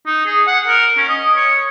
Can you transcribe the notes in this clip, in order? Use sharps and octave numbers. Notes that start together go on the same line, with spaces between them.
D#4
G#4
F#5
A#4
C#4
D#5
C#5